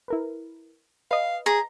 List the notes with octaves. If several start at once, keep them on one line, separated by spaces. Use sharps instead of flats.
E4 A#4 B4
B4 D#5 F5
G#4 A#5